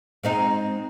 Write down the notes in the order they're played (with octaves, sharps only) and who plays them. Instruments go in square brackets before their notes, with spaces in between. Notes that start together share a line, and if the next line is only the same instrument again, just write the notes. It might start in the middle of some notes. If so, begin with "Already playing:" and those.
[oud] G#2 C4 D#4